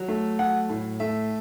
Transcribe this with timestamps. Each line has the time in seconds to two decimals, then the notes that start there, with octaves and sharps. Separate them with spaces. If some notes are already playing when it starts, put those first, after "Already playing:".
Already playing: F#3
0.08 A3
0.39 F#3 F#5
0.69 A2
1.00 A3 E5